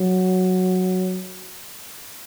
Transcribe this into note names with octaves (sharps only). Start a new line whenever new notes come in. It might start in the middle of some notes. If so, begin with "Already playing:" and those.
Already playing: F#3